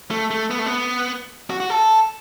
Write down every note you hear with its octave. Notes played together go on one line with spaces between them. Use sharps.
A3
A3
B3
A3
B3
F#4
F#4
A4